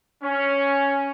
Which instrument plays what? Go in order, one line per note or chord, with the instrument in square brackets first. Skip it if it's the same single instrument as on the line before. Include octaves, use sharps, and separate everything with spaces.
[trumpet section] C#4